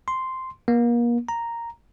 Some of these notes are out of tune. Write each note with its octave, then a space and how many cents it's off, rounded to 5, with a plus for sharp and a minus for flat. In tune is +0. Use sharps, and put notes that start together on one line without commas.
C6 -5
A#3 +35
A#5 +0